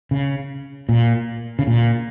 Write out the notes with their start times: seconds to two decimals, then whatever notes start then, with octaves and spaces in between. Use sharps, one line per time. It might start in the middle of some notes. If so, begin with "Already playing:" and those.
0.11 C#3
0.89 A#2
1.59 C#3
1.67 A#2